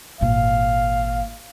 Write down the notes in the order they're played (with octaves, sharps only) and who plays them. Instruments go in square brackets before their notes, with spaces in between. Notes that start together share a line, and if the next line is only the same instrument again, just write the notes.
[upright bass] G#1 A#2 [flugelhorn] F5